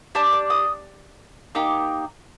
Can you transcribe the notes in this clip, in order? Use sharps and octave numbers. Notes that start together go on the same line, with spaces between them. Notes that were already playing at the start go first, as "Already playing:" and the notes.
D4 G4 A5
D6
D#6
A#3 D#4 G4 D6